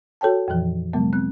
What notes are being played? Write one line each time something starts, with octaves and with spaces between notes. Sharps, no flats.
F#4 A4 C#5 G5 A5
F2 A#2 E3 F3
C3 F#3 G#3 B3
C4 F#6